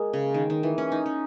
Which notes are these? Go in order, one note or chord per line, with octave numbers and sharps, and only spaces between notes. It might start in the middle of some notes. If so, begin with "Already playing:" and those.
Already playing: G#3 A#3
C#3
D#3
D#3
E3
C#4
D#4
C#4